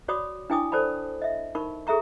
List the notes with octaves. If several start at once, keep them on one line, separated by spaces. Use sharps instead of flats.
F#4 C#5 D5 B5 D6 D#6
D4 E4 G5 G#5 D6 D#6
A4 C5 D5 A5 B5
D#5 E5
D#4 A#4 B5 C#6
G#4 A4 E5 A#5 C#6